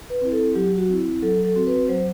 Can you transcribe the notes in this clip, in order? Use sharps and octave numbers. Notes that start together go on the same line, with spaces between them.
B4
C4 E4
A4
F#3 G4
F#4
C4 E4
F#3 A4
A4
C4 F#4
B4
F#3 C5